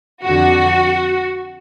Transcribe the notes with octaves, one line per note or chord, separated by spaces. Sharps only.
F2 D3 F#4